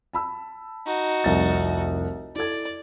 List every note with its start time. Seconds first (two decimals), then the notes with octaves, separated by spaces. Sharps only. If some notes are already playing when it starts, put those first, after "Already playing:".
0.13 A5 B5 E6
0.86 D#4 F#4
1.24 F1 C2 A6
2.36 E4 A4 D5 G#6